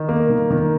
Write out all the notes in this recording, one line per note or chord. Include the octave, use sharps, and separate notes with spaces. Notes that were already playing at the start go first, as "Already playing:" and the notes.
Already playing: D#3 D#4
A#3
D#3
D#3